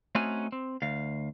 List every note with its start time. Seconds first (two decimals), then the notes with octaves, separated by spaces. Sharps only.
0.15 A3 C4 C#4 D#4 F#4 G#5
0.52 C4
0.82 D2 F5